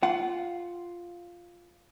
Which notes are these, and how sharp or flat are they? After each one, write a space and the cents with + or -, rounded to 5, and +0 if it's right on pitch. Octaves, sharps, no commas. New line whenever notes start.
F4 +0 F#5 +20